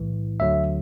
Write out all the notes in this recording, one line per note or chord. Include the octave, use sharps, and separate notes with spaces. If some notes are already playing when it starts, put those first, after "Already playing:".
Already playing: B1 A2 E3
D2 D3 F#3 E5